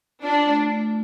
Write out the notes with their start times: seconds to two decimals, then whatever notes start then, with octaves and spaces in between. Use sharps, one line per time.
0.22 D4 F4
0.46 A3
0.71 A3